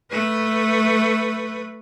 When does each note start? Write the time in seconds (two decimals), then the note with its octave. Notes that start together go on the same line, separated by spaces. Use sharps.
0.11 A3 B4